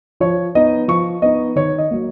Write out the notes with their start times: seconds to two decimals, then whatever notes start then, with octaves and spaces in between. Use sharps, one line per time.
0.20 F3 C#5
0.55 B3 D#4 D#5
0.88 F3 C#6
1.22 B3 D#4 D#5
1.56 D#3 C#5
1.78 D#5
1.91 F#3 A#3